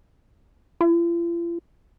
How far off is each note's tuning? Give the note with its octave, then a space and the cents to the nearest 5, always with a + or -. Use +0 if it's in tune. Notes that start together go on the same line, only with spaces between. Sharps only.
F4 -45